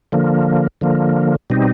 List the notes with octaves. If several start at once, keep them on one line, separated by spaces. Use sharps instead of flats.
D3 F3 A#3
D3 F3 A#3
B2 G3 C4 D#4